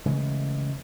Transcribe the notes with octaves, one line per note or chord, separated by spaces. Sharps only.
C#3 E3 G#3 A3